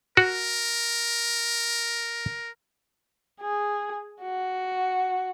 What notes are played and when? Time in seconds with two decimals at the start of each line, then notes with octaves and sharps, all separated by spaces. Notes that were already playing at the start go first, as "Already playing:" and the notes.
0.17 F#4 A#4
3.41 G#4
4.22 F#4